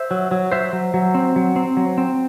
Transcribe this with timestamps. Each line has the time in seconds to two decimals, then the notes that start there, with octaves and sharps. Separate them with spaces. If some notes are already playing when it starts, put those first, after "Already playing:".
Already playing: C5 E5
0.11 F#3
0.31 F#3
0.52 F#3 C5 E5
0.73 F#3
0.94 F#3
1.15 C4
1.36 F#3
1.56 C4
1.77 F#3
1.98 C4